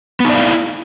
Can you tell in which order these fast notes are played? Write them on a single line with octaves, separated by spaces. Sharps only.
B3 D#4 D5 F5 E4